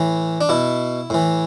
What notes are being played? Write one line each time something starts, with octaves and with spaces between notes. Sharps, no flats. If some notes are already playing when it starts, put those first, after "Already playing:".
Already playing: A2 E3
D4
B2 E4
A2 E3